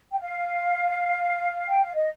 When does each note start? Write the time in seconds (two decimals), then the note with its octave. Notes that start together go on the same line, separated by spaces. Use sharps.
0.11 G5
0.19 F5
1.67 G5
1.82 F5
1.95 D#5